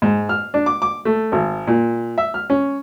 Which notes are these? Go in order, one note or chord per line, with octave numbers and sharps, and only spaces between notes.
G#2
F6
D4
D6
D6
A3
G#1
A#2
E5
F6
C#4